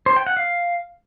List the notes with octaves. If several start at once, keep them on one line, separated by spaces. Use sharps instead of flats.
C5
G5
F#5
F5